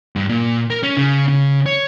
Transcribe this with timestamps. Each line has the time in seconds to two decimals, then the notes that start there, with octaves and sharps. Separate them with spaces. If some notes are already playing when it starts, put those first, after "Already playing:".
0.16 G2
0.30 A#2
0.70 A#4
0.83 C#4
0.97 C#3
1.28 C#3
1.66 C#5